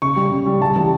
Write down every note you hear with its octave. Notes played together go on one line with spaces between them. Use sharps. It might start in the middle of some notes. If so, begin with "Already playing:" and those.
C#3 C#6
G3
C#3
G3
C#3 A5
E3 G3